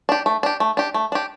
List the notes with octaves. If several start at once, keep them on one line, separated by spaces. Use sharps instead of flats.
D4 G4
A3
D4 G4
A3
D4 G4
A3
D4 G4